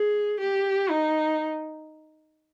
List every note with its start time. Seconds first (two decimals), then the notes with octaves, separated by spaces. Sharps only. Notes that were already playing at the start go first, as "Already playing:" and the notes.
Already playing: G#4
0.41 G4
0.90 D#4